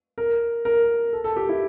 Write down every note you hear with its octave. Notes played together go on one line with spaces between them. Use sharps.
A#4
A#4
A4
A4
G4
E4